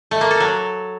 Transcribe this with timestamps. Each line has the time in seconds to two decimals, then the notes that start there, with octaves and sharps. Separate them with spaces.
0.11 A3
0.21 A#3
0.31 A4
0.40 F#3